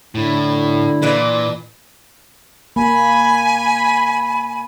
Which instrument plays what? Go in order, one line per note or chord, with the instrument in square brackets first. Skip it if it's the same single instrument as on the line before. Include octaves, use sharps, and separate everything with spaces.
[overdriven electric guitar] A2 [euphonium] D3 [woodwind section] E4
[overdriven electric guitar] A#2 [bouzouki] E3 D4 B4
[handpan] A#3 [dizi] G#5 [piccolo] B5